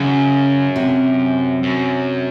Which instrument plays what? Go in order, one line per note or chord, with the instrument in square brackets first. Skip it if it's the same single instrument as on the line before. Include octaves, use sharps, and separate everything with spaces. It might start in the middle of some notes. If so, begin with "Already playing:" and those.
Already playing: [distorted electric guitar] F#2 [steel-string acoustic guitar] C#3
[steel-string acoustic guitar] C3
[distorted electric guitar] F#2